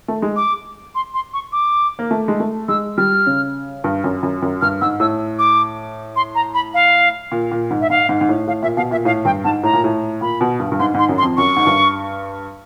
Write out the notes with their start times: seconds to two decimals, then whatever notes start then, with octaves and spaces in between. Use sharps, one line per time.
0.08 A3
0.22 G#3
0.36 D6
0.95 C6
1.14 C6
1.34 C#6
1.52 D6
1.99 A#3
2.11 A3
2.28 G#3
2.40 A3
2.68 G#3 E6
2.98 G3 F6
3.26 C#3
3.84 G2
4.04 F#2
4.23 F#2
4.42 F#2
4.61 G2 F6
4.81 G#2 E6
5.00 A2 E6
5.39 D6
6.16 C6
6.35 A#5
6.54 B5
6.74 F5
7.32 A#2
7.51 A#2
7.70 G#2
7.81 E5
7.90 G#2 F5
8.09 G#2
8.21 G#2
8.29 A2
8.47 A2 F5
8.62 A#2 E5
8.77 B2 F5
8.91 A#2 E5
9.05 A2 F5
9.25 G2 G5
9.44 G#2 A5
9.63 A2 A#5
9.73 A#2
9.84 A2
10.21 A#2 B5
10.41 B2
10.60 G2
10.72 G2
10.79 G#2 C6
10.94 G#2 C6
11.09 F#2
11.18 C6
11.23 F2
11.37 F#2 C#6
11.56 G#2
11.66 G2